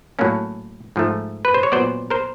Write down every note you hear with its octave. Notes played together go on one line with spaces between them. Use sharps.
A2 F#3 A#3 C#4
G#2 F3 A3
B4
C5
C#5
A#2 F#3 B3 C5 D5
A#4 C5